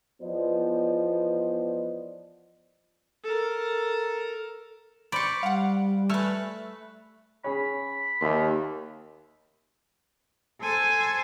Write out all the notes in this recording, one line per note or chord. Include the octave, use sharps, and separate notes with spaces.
E2 F3 B3 C5 D5 D#5
A4 A#4
C5 D5 B5 C#6
G3 F5 F#5
A3 B4 G#5 C#6 E6 F6
C#4 G#4 C#5 B5
D#2 E5 A5 C6
A4 C5 G#5